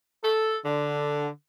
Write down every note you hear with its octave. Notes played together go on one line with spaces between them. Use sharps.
A4
D3